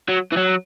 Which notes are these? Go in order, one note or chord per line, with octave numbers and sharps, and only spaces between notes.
F#3
E3
F#3